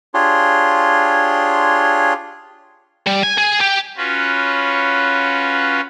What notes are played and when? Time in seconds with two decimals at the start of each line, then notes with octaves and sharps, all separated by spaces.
0.14 D4 F4 G4 G#4 C#5 C6
3.07 G3
3.23 G#5
3.38 G#4
3.60 G4
3.97 C#4 F4 F#4 B4